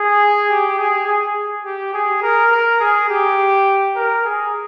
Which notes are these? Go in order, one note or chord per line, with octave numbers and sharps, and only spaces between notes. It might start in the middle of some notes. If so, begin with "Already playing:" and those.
Already playing: G#4
G4
G#4
G#4
G4
G#4
A#4
A#4
G#4
G4
A#4
G#4